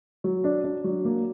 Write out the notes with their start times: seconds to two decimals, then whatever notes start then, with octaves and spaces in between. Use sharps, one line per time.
0.24 F#3
0.44 D4
0.64 D4
0.84 F#3
1.05 A#3